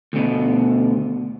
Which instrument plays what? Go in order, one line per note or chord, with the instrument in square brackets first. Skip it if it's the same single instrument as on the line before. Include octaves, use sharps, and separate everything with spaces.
[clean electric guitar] D2 B2